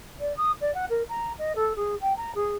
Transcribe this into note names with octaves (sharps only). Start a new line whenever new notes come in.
D5
D#6
D5
F#5
A#4
A#5
D#5
A4
G#4
G5
A#5
G#4